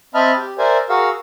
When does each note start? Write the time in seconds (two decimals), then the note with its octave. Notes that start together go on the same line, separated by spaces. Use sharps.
0.14 C4 D#5 E5 A5 B5 F6
0.38 G4
0.58 A#4 C5 D5 E5 G#5
0.89 F#4 G#4 A#4 F5 F#5 E6